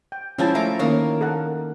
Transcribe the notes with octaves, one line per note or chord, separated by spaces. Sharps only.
G5
F3 G#3 C#4 E4 G5 A5
A3 E5 A#5 D6
D#3 A#3 C#4 C#5
A4 A#4 F#5